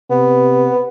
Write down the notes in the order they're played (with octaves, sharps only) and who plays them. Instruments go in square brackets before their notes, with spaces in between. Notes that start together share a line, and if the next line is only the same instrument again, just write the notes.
[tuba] C3 [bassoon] B3